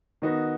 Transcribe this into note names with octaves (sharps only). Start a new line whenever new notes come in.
D#3 B3 D#4 F#4